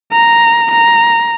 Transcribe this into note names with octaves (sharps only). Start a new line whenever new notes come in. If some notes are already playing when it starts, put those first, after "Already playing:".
A#5
A#5